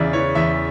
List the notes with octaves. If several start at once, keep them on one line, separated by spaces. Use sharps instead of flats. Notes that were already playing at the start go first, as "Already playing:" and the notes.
Already playing: E2 C#3 D5 E5
E3 C#5
E2 E5